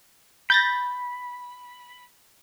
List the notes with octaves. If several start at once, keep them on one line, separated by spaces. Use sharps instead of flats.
B5 G6 A6 A#6